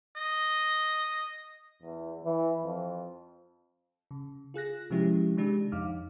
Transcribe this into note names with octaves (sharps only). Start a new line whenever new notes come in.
D#5
E2
E3
F2
C#3
F4 G#4 F#6 A#6
C3 F3 G#3 C#4 E4 G4
C3 D#3 G#3 D4 G4
F2 D#4 F5 D6 F6